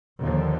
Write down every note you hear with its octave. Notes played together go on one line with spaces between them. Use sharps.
D#2 D3 F3